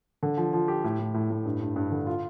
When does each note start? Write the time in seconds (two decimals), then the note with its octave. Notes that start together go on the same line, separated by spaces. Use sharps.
0.23 D3
0.37 F3
0.53 F3
0.68 G4
0.84 A2
0.99 A2
1.14 A2
1.30 A2
1.45 G2
1.61 G2
1.76 G2
1.91 D3
2.07 F4